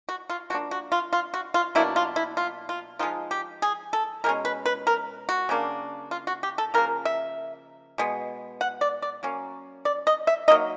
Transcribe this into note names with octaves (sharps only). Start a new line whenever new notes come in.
F#4
F4
F3 A#3 D4 F#4
F#4
F4
F4
F#4
F4
B2 F#3 A#3 D4 E4
F4
E4
F4
F4
F3 G#3 C4 D#4 F4
G4
G#4
A4
B2 G#3 C#4 A#4
B4
B4
A#4
F#4
C#3 F#3 A#3 D4
F4
F#4
G4
A4
C#3 F3 A#3 A#4
E5
B2 G#3 B3
F#5
D5
D5
F#3 A#3 C#4
D5
D#5
E5
F#3 A#3 D#4 D#5